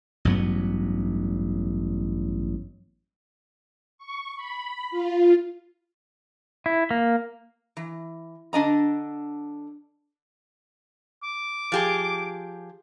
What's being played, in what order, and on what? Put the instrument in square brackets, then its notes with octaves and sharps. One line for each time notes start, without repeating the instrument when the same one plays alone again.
[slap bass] A1 G2 F#3 B3
[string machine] C#6
B5
F4
[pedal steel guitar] E4
A#3
[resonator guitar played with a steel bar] E3
D3 D4 D#5 A#5
[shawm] D6
[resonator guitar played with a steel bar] F3 G4 G#4